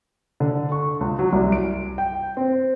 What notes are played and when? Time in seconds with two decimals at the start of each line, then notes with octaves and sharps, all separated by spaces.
0.40 D3
0.72 C#6
1.01 C#2
1.19 F#3
1.33 C2
1.52 D7
1.98 G5
2.37 C4